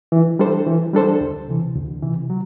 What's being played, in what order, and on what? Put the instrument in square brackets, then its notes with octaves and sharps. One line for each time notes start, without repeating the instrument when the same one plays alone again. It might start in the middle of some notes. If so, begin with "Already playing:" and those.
[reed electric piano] E3
G3 D4 A4 C5
E3
G3 D4 A4 C5
D2
C3 E3
D2
C3 E3
F#3